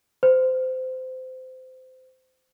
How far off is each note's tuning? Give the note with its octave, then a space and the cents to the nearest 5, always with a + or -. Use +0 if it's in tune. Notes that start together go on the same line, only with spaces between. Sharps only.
C5 -25